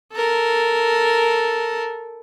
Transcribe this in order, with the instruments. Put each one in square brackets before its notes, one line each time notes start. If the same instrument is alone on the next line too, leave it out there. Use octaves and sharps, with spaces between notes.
[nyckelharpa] A4 A#4